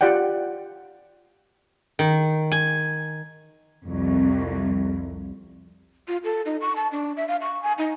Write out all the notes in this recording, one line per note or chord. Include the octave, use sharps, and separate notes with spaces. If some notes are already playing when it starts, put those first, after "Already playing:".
F4 G4 D5 F#5 G5
D#3
G#5
C2 F2
F4
A4
D#4
C#6
A5
D4
E5
F5
C#6
G#5
D#4